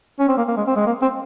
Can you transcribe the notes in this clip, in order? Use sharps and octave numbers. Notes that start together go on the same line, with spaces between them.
C#4
C4
A#3
A#3
G#3
C4
G#3
A#3
C4